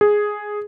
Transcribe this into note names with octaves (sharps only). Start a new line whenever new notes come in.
G#4